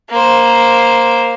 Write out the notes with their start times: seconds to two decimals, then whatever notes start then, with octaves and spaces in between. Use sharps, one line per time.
0.10 A#3 C5